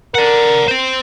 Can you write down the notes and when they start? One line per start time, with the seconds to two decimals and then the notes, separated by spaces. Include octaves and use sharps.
0.15 A#4 D5 F#5
0.68 C5 G5